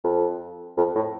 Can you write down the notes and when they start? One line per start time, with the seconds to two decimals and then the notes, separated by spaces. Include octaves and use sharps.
0.04 F2
0.77 F2
0.96 A2